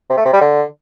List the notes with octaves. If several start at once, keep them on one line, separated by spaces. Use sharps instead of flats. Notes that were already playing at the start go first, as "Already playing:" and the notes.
C3
A3
C3
G3
D3